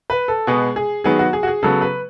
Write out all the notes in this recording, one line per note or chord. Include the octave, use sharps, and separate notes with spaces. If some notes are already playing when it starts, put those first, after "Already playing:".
B4
A4
B2 G#3 B3 G#4
G#4
D#3 F#3 B3 G#4
F#4
G#4
F#4
G#4
C#3 F#3 B3 A4
B4